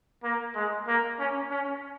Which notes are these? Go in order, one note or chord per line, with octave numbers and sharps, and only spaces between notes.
A#3
G#3
A#3
C#4
C#4